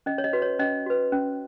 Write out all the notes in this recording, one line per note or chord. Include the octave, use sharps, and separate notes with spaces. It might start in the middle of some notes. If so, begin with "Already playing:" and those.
C#4 D#5
C#5
D#5
F#4 B4
C#5
C#4 D#5
F#4 B4
C#4